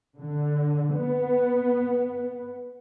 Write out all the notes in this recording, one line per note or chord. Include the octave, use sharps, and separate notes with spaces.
D3
B3